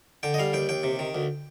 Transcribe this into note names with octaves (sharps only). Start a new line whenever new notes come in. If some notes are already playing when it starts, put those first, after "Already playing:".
D3 G5
D#5
G3 F5
D#2 G5
D#2 G5
C3
D#3
D2